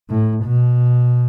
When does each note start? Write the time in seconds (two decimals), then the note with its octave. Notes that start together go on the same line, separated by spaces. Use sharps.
0.10 A2
0.44 B2